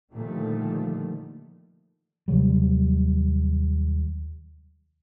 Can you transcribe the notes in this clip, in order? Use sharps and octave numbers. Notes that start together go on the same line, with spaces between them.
A#2 D3 D#3 F3 G3 A3
D#2 C3 F#3 G3